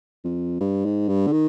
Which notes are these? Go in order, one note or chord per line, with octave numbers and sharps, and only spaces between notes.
F2
G2
G#2
G2
D3
D#3